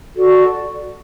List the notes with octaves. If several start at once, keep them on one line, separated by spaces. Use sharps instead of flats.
F#4 A4 D5